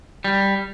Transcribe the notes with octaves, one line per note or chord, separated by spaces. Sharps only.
G3